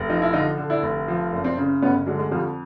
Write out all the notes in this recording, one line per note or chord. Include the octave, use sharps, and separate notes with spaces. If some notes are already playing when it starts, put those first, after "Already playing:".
Already playing: F1
F3 D#4
E4
D3 D#4 F4
D3
D4 E4
F1
F3
F#1
C4 D4
C#3
G1 B3 C#4
D3 F#3 G#3
G#3
F2 F3 G3